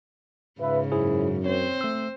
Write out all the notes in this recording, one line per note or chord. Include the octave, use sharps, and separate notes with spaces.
G#2 C#3 F4 B4 E5
F#2 E4 G#4 C5
C4 C5 C#5
A3 E6